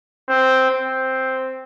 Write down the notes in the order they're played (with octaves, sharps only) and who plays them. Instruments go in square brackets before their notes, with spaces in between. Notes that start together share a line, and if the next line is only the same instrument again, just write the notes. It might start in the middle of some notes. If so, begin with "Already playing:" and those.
[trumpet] C4
C4